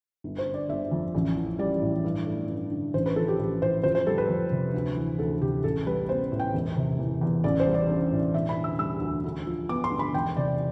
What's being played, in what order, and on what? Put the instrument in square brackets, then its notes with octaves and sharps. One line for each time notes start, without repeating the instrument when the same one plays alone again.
[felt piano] G1
C5
D3
D5
G1 E5
F2
A1
E3
G3 D5
A2
G2
A3
G2
D3
A1 C5
B4
F3 A4
G4
A1
A2 C5
F2 C5
C5
G3 A4
B4
F2
C3
D2
E3
D2 A4
C3 G4
A1 A4
G3 B4
B3 C5
A2
G5
E1
C3
E3
E2
A1 D5
C5
G3
D5
D4
A2
E1 E5
B5
D3
E6
G3 E6
D2
D2
F3
B3 D6
C6
D3
B5
E1 G5
C3 D5